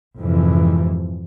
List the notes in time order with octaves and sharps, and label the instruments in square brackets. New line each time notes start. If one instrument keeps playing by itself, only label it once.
[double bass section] F2 G#2 C3 E3 F3